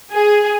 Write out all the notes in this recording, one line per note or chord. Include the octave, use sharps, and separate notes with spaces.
G#4